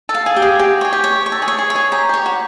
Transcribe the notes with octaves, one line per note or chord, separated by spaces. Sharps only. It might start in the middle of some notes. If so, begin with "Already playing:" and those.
A4
F5
G#4
G4
G#4
F#4 G4
G#4 C#5
G4
C#5
C#5
A4
G#4
C#5
G#4
C#5
G#4
G4 A#5
G4 C#5
F#4